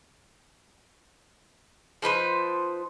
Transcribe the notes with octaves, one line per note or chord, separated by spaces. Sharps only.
F3 D#4 B4 C5